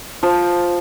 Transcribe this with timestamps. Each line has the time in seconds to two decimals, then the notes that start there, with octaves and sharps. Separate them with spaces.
0.23 F3